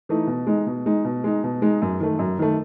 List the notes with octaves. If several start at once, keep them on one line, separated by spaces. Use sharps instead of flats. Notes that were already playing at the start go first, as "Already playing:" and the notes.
E3 A3 D#4
B2
G#3 D#4
B2
G#3 D#4
B2
G#3 D#4
B2
G#3 D#4
F#2
D#3 A3
F#2
D#3 A3